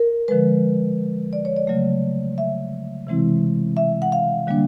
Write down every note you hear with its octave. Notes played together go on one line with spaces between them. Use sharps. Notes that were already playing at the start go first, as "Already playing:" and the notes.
Already playing: A#4
D3 F3 G#3 B4
D5
C#5
D5
C#3 F#3 A3
E5
C3 E3 G#3 C4 E4
E5
F#5
F5
D3 G3 A#3 D4